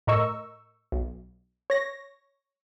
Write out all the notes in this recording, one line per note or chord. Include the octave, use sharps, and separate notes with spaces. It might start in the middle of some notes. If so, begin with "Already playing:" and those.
A2 A#4 D#5 C#6 E6
B1
C#5 A#6